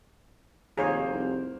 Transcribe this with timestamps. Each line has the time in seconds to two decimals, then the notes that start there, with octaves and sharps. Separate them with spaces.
0.77 F1 D#2 A#3 G#4 C5 C#5
1.12 C2